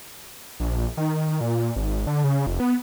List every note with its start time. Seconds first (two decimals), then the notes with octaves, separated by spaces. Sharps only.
0.60 A#1
0.97 D#3
1.41 A#2
1.76 G#1
2.07 D3
2.24 C#3
2.47 F1
2.60 B3